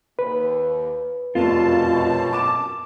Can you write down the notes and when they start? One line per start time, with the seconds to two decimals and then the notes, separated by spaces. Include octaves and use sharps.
0.19 D#2 B4
1.35 F1 F#2 B2 F4 A5
2.33 D6 E7